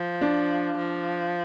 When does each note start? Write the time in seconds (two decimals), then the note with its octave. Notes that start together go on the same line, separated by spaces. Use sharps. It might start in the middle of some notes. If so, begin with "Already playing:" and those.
Already playing: F3
0.21 D4
0.77 F3